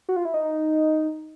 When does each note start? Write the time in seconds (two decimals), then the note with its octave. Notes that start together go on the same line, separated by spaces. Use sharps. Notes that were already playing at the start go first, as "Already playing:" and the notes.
0.09 F#4
0.16 F4
0.25 E4
0.34 D#4